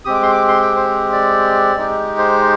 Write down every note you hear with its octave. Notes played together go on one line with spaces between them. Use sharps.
G#3 C4 G4 D#6
D6
C6
D6
C6
G5
C5
D5
G#3 D#4 G4
C5